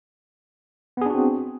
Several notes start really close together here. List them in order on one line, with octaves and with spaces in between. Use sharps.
B3 G#4 D4 F#4 C4